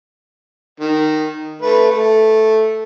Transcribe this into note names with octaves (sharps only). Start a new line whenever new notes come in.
D#3
A3 B4
A3